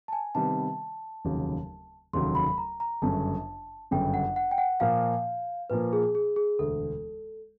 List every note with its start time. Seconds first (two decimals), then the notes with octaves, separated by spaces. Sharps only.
0.08 A5
0.13 G#5
0.35 C3 D#3 G3 B3 A5
1.25 F1 D#2 C#3 F#3
2.13 F1 D#2 C#3 F#3 C6
2.35 B5
2.58 A#5
2.80 A#5
3.02 G1 F#2 C#3 A5
3.91 G1 F#2 C#3 G5
4.14 F#5
4.36 F#5
4.51 G5
4.58 F#5
4.80 A#2 F3 A#3 F5
5.70 A#2 F3 A#3 B4
5.93 G#4
6.15 G#4
6.36 G#4
6.59 E1 D2 D3 A4